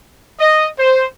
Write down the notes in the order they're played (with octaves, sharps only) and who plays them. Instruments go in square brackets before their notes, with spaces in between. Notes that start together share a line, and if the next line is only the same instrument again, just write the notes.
[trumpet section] D#5
C5